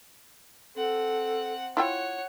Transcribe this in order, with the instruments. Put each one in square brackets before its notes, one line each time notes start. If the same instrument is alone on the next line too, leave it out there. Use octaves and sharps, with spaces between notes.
[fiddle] C4 F#5 [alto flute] A4
[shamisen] E4 F4 G5 [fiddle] C#5 [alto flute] F#5